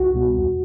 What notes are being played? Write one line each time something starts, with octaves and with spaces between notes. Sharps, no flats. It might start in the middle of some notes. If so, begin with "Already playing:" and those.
Already playing: C#2 F#4
B2 G3 B3
E2